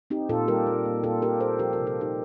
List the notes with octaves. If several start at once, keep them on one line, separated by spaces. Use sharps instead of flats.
C4 D#4 G4
A#2 F4 A4
G3 G4 A#4
A#3
A#3
A#2 F4 A4
A#3 G4 A#4
A#2 A4 C5
F3 G4 A#4
C3 G4 A#4
F4 A4
C3 D#4 G4